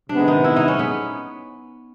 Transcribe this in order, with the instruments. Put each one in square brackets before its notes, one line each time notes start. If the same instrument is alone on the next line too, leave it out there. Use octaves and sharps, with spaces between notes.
[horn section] C3 D#3 G#3 B3 [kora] D4
[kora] D#4
E4
D#4
C#4
B3